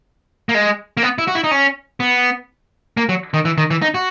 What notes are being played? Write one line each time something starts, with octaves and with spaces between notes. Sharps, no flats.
A#3
G#3
A#3
B3
E4
F#4
E4
D#4
C#4
B3
A#3
F#3
D#3
E3
D#3
E3
D#4
F#4